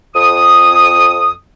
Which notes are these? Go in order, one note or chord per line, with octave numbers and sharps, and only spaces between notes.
F2 D#6